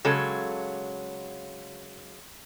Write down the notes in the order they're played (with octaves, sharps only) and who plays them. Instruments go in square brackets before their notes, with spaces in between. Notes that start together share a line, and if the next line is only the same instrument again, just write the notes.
[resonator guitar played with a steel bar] C#3 F#3 G#3 A4